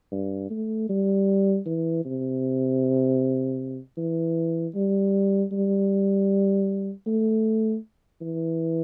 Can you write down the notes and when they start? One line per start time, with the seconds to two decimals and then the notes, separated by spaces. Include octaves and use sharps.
0.12 G2
0.50 A3
0.89 G3
1.66 E3
2.05 C3
3.98 E3
4.75 G3
5.52 G3
7.07 A3
8.22 E3